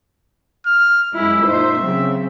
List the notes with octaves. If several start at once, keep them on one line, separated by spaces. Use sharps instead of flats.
F6
F#2 G#3 E4 E6
A#2 D#4 C5 E5
C#3 F#3 C4